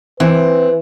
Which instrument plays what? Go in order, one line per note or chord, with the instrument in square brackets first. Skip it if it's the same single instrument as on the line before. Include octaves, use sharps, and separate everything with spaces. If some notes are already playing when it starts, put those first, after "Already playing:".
[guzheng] E3 [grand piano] C4 [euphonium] B4